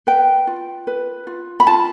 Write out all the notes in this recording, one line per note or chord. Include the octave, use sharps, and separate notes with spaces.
B4 G5
F4
B4
F4
B5
F4 A5